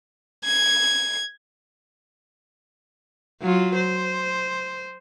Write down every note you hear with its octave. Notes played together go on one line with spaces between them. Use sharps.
G#6
F#3 F4
C5